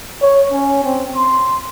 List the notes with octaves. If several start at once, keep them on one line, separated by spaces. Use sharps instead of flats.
C#5
C#4
C4
C6